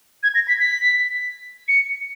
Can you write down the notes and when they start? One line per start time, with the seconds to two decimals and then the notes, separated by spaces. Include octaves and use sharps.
0.23 G#6
0.35 A#6
0.48 B6
0.60 B6
1.68 C#7